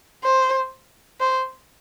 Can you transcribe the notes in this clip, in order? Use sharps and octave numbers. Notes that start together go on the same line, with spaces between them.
C5
C5